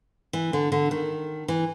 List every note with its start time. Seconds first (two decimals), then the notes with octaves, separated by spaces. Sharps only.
0.33 E3
0.53 D3
0.72 D3
0.91 D#3
1.48 E3